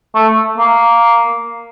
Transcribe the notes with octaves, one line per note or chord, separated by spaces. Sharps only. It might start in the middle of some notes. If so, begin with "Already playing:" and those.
A3
A#3